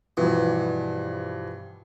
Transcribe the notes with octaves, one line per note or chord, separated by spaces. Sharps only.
G2 B2 E3 F3